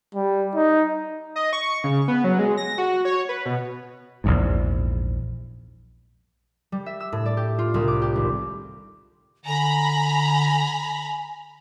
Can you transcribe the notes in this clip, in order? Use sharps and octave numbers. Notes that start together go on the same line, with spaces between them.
G3
D#4
D#5
C#6
C#3
B3
F#3
G#3
A#6
F#4
C#5
B4
B2
A#1 E2 G#2
G3
E5
E6
A2
D5
G4
F4
C2
D6
G4
G#1
D3 G#5 A#5 B5